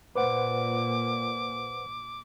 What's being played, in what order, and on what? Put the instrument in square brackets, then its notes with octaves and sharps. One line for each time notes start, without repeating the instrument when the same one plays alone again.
[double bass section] A#2 [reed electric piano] B4 C5 F#5 [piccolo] D6